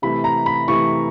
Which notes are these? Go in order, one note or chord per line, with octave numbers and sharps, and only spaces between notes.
C3 E3 A3 B5
A#5
B5
C3 E3 A3 C#6